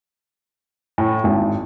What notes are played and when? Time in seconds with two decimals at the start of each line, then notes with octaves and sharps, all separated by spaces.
0.98 A2
1.24 G#1